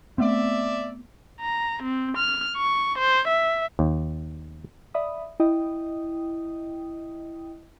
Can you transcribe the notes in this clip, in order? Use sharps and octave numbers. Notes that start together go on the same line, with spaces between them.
A3 B3 C4 D5 E5
A#5
C4
F6
C#6
C5
E5
D#2
D5 E5 B5 D#6
E4 D#5 G5 D#6